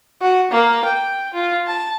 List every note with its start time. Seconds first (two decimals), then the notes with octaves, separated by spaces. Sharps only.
0.22 F#4
0.51 A#3
0.84 G5
1.34 F4
1.67 A5